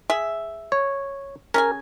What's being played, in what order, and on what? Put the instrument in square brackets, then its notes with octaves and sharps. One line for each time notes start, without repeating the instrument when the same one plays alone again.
[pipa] G#4 E5
[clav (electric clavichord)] C#5
[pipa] C#4 G#4 G#5 [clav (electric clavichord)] A#4